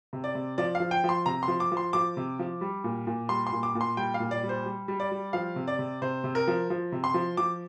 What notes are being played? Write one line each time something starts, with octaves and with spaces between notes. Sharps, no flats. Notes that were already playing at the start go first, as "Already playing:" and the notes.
C3
D5
C3
F3 D5
F5
F3
G5
F3
C6
C3 A#5
C6
F3
D6
F3
C6
F3 D6
C3
F3
G3
A#2
A#2
G3 C6
C6
A#2
D6
A#2
C6
G3 G5
F5
A#2
D5
G3
C5
G3
G3
D5
G3
F3 F5
C3
D5
C3
C3 C5
C3
A#4
F3
F3
C3
C6
F3
F3 D6